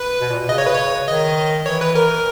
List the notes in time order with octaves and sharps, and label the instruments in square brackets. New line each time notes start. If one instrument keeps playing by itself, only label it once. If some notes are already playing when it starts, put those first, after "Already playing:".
Already playing: [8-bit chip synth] B4
[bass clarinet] B2
A#2
B2
[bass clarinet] C#3 [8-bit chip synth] D#5
[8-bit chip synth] C#5
B4
C#5
[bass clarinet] D#3 [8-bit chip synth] D#5
[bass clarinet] E3 [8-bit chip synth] C#5
[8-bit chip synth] B4
A#4